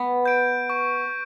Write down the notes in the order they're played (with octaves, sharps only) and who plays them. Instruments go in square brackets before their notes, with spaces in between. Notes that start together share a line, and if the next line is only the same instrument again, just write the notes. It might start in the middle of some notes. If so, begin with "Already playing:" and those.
Already playing: [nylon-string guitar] B3
[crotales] G6 D7
C#6